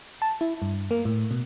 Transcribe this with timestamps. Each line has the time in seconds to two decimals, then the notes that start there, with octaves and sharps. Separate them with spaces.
0.22 A5
0.41 E4
0.62 G2
0.91 A#3
1.05 A2
1.31 B2